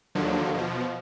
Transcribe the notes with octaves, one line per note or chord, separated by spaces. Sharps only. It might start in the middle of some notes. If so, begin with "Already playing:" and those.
D#2 D3 F3 F#3
B2 F3